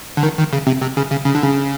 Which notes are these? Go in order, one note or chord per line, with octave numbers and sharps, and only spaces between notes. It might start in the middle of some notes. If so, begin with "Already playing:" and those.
D3
D#3
D#3
C#3
C3
C3
C#3
C#3
C#3
D3
C#3